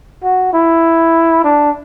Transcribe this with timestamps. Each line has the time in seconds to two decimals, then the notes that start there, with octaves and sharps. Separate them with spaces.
0.23 F#4
0.53 E4
1.44 D4